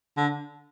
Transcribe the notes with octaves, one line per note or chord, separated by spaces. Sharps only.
D3